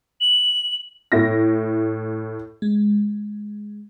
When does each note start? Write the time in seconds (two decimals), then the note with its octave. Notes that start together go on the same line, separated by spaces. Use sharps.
0.21 F#7
1.12 A2 E4 A#6
2.62 G#3